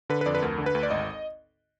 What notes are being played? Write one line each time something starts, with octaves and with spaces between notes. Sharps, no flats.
D3 B4
B4
F2 D5
B4
D2 A#4
D3
B4
D2
D5
G#1 D#5